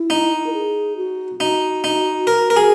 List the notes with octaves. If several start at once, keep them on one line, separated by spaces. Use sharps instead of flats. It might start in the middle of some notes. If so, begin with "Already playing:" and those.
Already playing: E4
D#4
A#4
G#4
F#4
D#4 F#4
D#4
A#4
A#4
G#4